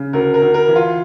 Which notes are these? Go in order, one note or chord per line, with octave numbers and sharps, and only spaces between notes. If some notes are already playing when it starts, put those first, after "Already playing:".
Already playing: C#3
D2 A#4
A#4
D2
A#4
E3
F4